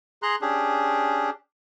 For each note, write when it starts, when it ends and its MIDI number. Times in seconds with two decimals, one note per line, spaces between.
0.22 0.36 68
0.22 0.36 82
0.22 0.36 84
0.22 0.36 90
0.41 1.30 61
0.41 1.30 62
0.41 1.30 67
0.41 1.30 68